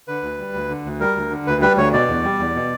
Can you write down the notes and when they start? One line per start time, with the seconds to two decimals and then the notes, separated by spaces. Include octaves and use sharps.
0.08 D3 B4
0.23 D2
0.39 G3
0.54 D2
0.69 D3
0.85 D2
1.00 G3 A#4
1.16 D2
1.31 D3
1.47 D2 B4
1.61 G3 B4
1.77 D2 C#5
1.93 B2 D5
2.08 E2
2.24 G3
2.39 E2
2.55 B2